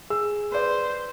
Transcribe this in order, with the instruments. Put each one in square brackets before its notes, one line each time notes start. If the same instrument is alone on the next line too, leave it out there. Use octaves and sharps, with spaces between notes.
[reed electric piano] G#4 [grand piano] E6
[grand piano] B4 D5 [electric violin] C5